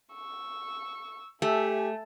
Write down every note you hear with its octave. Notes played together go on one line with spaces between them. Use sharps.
C#6 E6
A3 G4 E5 G#5